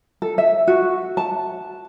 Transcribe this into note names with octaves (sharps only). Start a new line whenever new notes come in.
A4
E5
F#4
A5